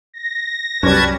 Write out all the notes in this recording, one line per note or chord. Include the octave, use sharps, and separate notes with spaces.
A#6
C2 F#2 G3 C#4 B4 A5 G#6